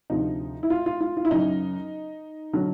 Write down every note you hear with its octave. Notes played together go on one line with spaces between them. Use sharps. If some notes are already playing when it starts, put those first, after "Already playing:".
D2 C3 F3 D#4
E4
F4
F4
F4
F4
E4
F#2 C#3 F#3 D#4
D3 F#3